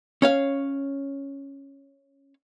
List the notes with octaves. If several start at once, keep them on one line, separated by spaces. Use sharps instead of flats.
C#4 C#5 F5